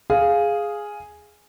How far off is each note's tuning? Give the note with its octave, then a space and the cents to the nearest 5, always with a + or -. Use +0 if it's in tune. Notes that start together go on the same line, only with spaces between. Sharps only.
G#4 +0 F5 +0